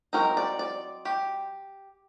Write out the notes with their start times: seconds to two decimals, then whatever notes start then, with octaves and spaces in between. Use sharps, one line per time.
0.13 F#3 C4 D#4 A#4
0.37 D5
0.59 D5
1.05 G4